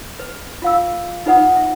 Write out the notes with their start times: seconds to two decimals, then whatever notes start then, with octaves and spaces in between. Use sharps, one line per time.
0.20 B4
0.62 F4 F5 E6
1.26 D#4 F4 B4 D#5 F#5 D#6
1.56 E5